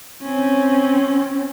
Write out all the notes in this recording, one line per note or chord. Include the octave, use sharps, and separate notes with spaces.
C4 C#4